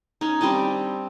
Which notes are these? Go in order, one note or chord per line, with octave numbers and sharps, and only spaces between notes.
C#4 D#4
G3 C4 D4 D#5